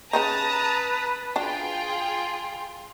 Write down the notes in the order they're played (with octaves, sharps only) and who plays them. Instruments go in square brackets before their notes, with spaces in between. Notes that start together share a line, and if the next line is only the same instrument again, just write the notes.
[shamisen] C#3 C#4 D#4 [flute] B4 [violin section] A5 A#5 D#6
[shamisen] D4 F#4 [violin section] F4 G#4 G5
[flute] C6